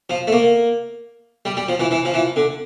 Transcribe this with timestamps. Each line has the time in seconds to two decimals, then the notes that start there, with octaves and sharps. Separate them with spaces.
0.10 F3
0.27 A3
0.32 A#3
1.45 G3
1.57 G3
1.68 F3
1.80 E3
1.91 E3
2.05 F3
2.14 E3
2.36 D3